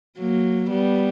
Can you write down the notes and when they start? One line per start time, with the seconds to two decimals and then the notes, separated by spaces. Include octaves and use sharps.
0.19 F#3 A#3
0.70 G3 B3